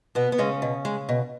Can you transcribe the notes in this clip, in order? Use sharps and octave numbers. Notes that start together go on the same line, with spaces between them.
B2 B3
B3
C#3 G#3 C#4
B2
G#3
B2